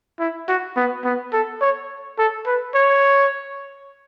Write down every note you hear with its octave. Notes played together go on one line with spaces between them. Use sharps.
E4
F#4
B3
B3
A4
C#5
A4
B4
C#5